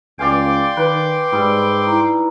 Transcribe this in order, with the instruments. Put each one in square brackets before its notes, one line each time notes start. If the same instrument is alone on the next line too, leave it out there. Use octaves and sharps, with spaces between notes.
[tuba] C#2 [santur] D5 F5 G#5 [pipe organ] G5 C6 D6
[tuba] D#3 [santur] B4
[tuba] G#2 [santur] G3 [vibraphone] B5 D#6 E6
[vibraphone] D#4 E4 A#5